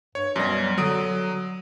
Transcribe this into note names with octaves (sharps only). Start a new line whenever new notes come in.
G2 C#5
F#2 B2 G3 A#6
G3
D3 F#3 D#6 D7